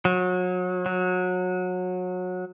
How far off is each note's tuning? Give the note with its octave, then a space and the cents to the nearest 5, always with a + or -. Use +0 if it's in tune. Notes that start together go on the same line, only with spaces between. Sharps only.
F#3 -30
F#3 -25